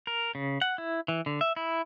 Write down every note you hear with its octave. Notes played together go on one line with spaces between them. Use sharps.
A#4
C#3
F#5
E4
E3
D3
E5
E4